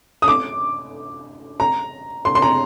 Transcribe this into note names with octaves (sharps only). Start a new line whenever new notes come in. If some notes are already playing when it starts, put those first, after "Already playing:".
D#6
D6
A#5
C6
C6
A#5